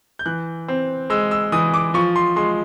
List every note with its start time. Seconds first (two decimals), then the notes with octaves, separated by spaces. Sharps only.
0.19 G6
0.26 E3 F#6
0.68 C4
1.10 G#3 E6
1.31 E6
1.52 E3 D#6
1.74 D6
1.94 F3 C#6
2.16 C6
2.36 G#3 C6